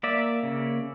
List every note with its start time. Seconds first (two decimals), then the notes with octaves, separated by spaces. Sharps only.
0.03 A#3 D5 E5
0.43 C#3